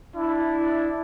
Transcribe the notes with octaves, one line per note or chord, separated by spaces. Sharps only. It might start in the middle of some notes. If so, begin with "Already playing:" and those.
D4 E4